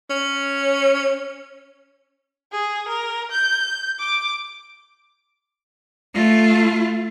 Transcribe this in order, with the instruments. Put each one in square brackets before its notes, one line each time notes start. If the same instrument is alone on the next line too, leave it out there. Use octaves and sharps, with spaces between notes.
[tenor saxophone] C#4
[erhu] G#4
A#4
G6
D6
[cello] A3 F4